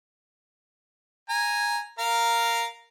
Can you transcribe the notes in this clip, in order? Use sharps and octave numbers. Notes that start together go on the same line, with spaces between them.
G#5 A#5
A#4 F5 A#5